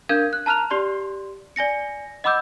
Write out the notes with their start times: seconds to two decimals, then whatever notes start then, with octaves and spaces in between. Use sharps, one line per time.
0.09 D4 A#4 F5 G6 G#6
0.33 F#6
0.46 A5 A#5 F6 F#6 F7
0.71 G4 D5 C6
1.56 D5 G#5 A#6 C#7
2.24 D#5 F#5 B5 D6 E6 G6